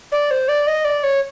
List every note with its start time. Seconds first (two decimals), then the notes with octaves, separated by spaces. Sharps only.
0.12 D5
0.31 C5
0.48 D5
0.67 D#5
0.85 D5
1.03 C#5